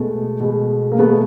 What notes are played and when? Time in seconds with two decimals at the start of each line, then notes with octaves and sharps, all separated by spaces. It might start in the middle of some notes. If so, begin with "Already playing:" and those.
Already playing: B2 G#3 A3 B3
0.40 B2 G#3
0.92 A#3
0.99 B2 G#3 A3 B3